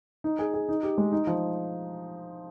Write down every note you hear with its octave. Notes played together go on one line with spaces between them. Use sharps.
D#4
G#4
G#4
D#4
G4
G#3
D#4
F3